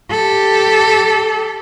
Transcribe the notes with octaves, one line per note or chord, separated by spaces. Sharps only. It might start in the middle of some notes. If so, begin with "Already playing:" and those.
G4 A4